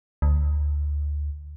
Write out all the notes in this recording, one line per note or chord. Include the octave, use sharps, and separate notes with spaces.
D2